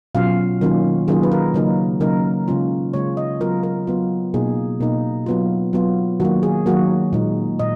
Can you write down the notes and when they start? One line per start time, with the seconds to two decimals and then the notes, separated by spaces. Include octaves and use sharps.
0.15 B2 F#3 C#4 F4 F5
0.61 D#3 F#3 A#3 C#4 F4
1.08 D#3 F#3 A#3 C#4 F4 G#4
1.23 B4
1.32 A#4
1.54 C#3 F#3 A#3 D#4
2.00 C#3 F#3 A#3 D#4 A#4
2.48 C#3 G#3 C#4 F4
2.93 C#3 G#3 C#4 F4 C#5
3.17 D#5
3.41 F#3 B3 F4 A#4
3.63 A#4
3.87 F#3 B3 F4
4.34 B2 A#3 D#4 G#4
4.80 B2 A#3 D#4
5.26 F#3 B3 F4
5.73 F#3 B3 F4
6.20 D#3 F#3 A#3 F#4
6.43 G#4
6.66 D#3 F#3 A#3 F#4
7.13 A#2 G#3 D#4
7.59 A#2 D#5